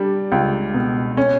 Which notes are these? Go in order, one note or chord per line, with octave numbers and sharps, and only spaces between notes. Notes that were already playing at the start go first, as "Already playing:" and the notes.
Already playing: G3 D4
C#2
B2
C#4